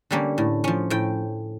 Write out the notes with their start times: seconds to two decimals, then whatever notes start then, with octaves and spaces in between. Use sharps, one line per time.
0.11 D3 G3 A#3 C#4
0.38 A2
0.64 F3 C#4
0.90 A2 G5